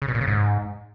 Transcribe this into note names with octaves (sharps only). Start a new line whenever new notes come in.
C#3
B2
A#2
C#3
G#2